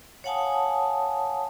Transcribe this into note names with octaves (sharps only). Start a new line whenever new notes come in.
C#5 F5 F#5 G#5 A5 D#6